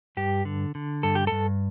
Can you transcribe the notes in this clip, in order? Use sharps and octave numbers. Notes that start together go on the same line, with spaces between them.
G2 G4
D3
D3
G2 A4
G4
G2 A4